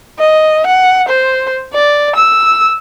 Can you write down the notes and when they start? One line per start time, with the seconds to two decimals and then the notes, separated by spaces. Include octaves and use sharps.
0.19 D#5
0.66 F#5
1.08 C5
1.73 D5
2.15 E6